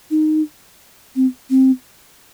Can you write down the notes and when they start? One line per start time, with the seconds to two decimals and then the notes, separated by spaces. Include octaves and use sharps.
0.11 D#4
1.16 C4
1.50 C4